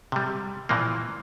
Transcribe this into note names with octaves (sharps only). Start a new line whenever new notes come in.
C3 G3
A#2 E3 F3 A#3